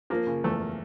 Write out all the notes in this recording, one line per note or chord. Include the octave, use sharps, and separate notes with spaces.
F3 A#3
C#3
E2 A3